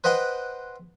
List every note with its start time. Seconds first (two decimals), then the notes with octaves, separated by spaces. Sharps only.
0.04 B4 C5 D#5 F#5 G5 C6